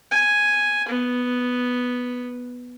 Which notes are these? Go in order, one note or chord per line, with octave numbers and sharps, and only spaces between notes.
G#5
B3